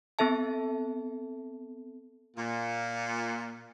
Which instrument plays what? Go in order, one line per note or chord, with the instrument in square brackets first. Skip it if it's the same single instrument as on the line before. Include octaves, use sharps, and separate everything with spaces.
[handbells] B3 C4 A4 E5 A5
[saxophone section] A#2